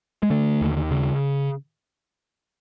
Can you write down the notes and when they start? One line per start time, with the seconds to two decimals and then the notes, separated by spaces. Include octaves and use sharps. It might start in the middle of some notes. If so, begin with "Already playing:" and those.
0.23 G#3
0.30 D3 A3
0.61 D#2
0.91 C#3